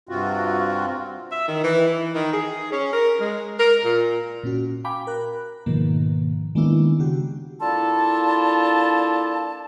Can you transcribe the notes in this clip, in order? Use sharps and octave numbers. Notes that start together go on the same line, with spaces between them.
G2 C3 C4 F4 F#4
E5
D#3
E3
E3
D#3
G#4
C#4
A#4
G#3
A#4
A#2
A#2 C#4 F#4
F5 G5 G#5 B5 D6
A#4 F#6
G#2 B2 D#3 F3 A#3
D#3 G#3 A#3 B3 D4 E4
C#3 F#4 G4
A#3 D4 E4 F4 A4 A5